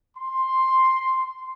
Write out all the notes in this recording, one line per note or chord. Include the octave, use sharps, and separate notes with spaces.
C6